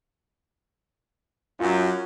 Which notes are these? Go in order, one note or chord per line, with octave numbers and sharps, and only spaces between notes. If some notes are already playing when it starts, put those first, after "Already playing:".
F#2 F4